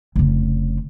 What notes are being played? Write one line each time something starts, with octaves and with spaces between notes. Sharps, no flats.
F1 C#3